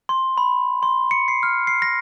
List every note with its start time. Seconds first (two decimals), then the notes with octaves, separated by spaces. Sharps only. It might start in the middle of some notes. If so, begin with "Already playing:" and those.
0.09 C6
0.38 B5
0.83 C6
1.11 C#7
1.28 C7
1.43 F6
1.67 C7
1.82 A#6